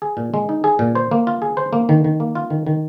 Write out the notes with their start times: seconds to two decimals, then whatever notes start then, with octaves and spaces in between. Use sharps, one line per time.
0.02 G#4
0.17 A#2
0.34 G#3
0.49 D#4
0.64 G#4
0.79 A#2
0.95 C5
1.11 A#3
1.27 F4
1.42 G#4
1.57 C5
1.73 A#3
1.89 D#3
2.04 D#3
2.20 A#3
2.35 F4
2.50 D#3
2.67 D#3